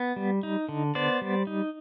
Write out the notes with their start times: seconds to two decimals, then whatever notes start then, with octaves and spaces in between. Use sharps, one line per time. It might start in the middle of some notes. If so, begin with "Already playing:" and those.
Already playing: B3
0.16 G3
0.43 D#4
0.69 D3
0.95 B3 C5 D5
1.21 G3
1.47 D#4